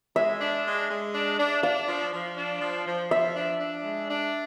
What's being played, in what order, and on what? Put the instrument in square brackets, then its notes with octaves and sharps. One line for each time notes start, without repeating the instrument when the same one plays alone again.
[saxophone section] G#3 [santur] E5
[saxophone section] D4
G#3
G#3
D4
D4
[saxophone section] D4 [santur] F5
[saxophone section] F3
F3
D4
F3
F3
[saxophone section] F3 [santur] E5
[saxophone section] D4
D4
G#3
D4